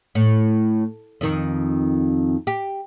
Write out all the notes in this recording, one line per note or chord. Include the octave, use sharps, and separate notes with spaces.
A2
F2 D#3
G4